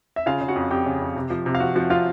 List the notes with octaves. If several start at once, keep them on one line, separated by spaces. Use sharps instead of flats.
E5
C#3 F4 F5
C#3
F#4 F#5
F2
F2 G4 G5
C#3
F2
C3
F3
C3
F5
F3 F#4 F#5
F3 F#4 F#5
F3 F4 F5